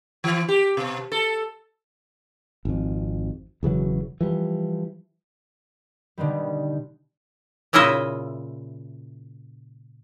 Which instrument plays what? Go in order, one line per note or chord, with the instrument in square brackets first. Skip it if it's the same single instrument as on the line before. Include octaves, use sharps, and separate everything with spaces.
[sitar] E3
G4
B2
A4
[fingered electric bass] G#1 F2
E1 C#3 E3 F#3
E3 F3 G3
[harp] B2 D3 D#3 G3
[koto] A#2 C#3 E4 F4 D#5 E5